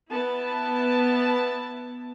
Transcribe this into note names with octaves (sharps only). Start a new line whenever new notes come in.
B3 E4 A5